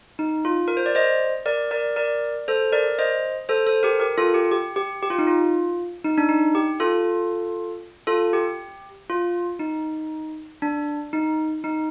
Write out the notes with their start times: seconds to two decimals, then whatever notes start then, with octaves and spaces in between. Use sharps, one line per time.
0.19 D#4
0.45 F4
0.68 A#4
0.77 C5
0.86 D5
0.95 C5 D#5
1.46 A#4 D5
1.71 A#4 D5
1.96 A#4 D5
2.48 A4 C5
2.73 A#4 D5
2.99 C5 D#5
3.49 A4 C5
3.66 A4 C5
3.83 G4 A#4
4.00 G4 A#4
4.18 F4 A4
4.34 G4
4.51 G4
4.76 G4
5.03 G4
5.10 F4
5.19 D#4
5.27 F4
6.04 D#4
6.18 D4
6.29 D#4
6.55 G4
6.80 F4 A4
8.07 F4 A4
8.33 G4
9.10 F4
9.59 D#4
10.62 D4
11.13 D#4
11.64 D#4